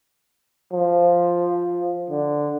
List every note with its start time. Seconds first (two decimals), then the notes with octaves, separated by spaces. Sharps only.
0.73 F3
2.10 D3